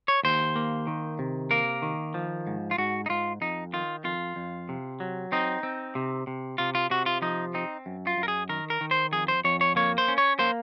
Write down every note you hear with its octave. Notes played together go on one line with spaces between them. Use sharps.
C#5
D#2 C5
A#3
D#3
C3
A#3 A#4
D#3
F3
G#2
F4
G#2 F#4
D#4
G#2 F4
F2 D#4
D#3 F4
F2 F4
F2
C3
F#3
C4 D#4
C4
C3
C3
C3 F4
F4
C3 F#4
F4
F3 D#4
C4 D#4
F#2
F4
F#2
A#4
G#4
D#3 A#4
A#4
D#3
C5
F2 G#4
C5
F2 C#5
C#5
A#3 C#5
C5
C#4
C#5
A#3 C5